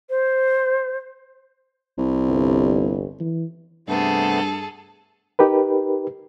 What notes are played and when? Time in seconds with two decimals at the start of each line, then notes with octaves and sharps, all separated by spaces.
0.10 C5
1.98 C2
2.28 G1
3.20 E3
3.88 G2 C3 A3 B3 G#4 A4
5.39 D#4 G4 A#4 B4